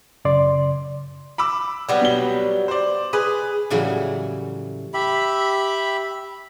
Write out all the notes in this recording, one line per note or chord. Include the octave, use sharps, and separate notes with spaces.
F#2 C#3 D5 C6
B5 D6 E6
F#3 G3 B3
B2 G7
C5 D5
G#4 B4
A2 C#3 E3 F#3 G3
G4 E5 B5